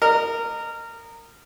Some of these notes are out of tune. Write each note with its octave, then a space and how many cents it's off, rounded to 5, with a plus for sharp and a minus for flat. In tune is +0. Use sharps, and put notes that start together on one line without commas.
A#4 -20 D#5 -25